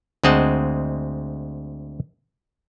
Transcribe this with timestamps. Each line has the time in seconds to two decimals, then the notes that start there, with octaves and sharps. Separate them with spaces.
0.24 D2 G#3 C4 D#5 F#5 A5